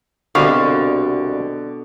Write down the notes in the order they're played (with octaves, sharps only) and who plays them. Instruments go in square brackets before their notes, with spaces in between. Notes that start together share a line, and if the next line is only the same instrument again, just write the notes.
[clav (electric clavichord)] C2 B3 F5 [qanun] B2 [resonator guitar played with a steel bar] D3 [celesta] C#6